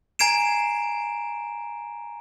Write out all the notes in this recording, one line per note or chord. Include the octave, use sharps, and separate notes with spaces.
G#5 A#5 G#6 C7 D7 E7